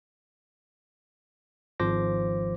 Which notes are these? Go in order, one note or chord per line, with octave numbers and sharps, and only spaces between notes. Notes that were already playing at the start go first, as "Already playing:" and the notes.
G#1 F3 C5 D6 A#6